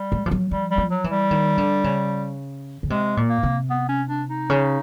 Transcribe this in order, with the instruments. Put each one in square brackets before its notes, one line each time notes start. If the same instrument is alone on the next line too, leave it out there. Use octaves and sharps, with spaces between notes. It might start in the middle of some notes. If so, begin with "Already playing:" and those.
Already playing: [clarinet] G3
[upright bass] G#3
F3
F#3
[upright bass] F3 [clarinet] G3
[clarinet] G3
[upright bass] F3
[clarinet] F#3
[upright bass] E3
[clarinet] G3
[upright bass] D#3
D3
C#3
C#3
[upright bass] C3 [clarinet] G#3
[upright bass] A#2
[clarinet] A#3
[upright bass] C3
[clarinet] B3
C#4
D4
D#4
[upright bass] C#3